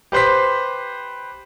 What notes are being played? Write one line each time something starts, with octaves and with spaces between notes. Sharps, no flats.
G4 B4 C5 C6 B6